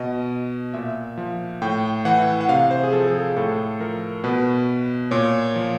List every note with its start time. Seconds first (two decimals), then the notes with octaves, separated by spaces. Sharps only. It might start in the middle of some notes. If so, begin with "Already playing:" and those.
Already playing: B2 D#5
0.74 A#2 E5
1.18 F3
1.62 A2 G5
2.05 E3 F#5
2.41 F#5
2.49 C3 F5
2.71 C5
2.83 G#4
2.93 F3 A4
3.08 A4
3.15 G#4
3.37 A2 A4
3.80 F3 A#4
4.24 B2 B4
5.11 A#2 C#5
5.56 F3